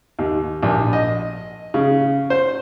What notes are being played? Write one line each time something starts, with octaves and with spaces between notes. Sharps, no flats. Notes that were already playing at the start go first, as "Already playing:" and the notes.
D#2
A#1
D#5
C#3
C5